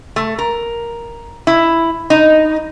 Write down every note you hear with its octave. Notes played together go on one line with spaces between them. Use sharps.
A3
A#4
E4
D#4